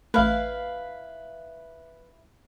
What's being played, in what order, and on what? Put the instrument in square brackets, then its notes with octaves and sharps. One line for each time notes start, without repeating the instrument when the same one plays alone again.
[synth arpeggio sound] A1 A3 [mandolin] E4 F5 [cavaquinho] B4